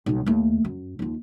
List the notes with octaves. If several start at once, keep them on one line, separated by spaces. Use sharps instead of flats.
B1 G3
D#2 A3
F#2
D#2 F4